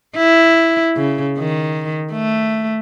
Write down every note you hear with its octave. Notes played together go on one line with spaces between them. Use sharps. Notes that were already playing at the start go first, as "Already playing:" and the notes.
E4
C#3
D#3
A3